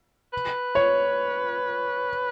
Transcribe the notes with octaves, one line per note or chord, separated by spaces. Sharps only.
B4
C#5